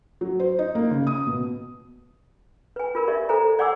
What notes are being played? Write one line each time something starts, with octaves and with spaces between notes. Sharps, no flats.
F#3
C5
D#4
A#3
C#3
D#6
B2
B4 G#5
F4 A#4 B5
G4 D5 E5
A4 C5 G#5 A#5
D5 F#5 G#5 C6 D6 E6